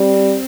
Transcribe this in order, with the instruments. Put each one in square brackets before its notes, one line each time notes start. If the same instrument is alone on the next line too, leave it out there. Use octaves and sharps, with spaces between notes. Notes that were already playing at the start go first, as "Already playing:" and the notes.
Already playing: [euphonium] G3 [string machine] C4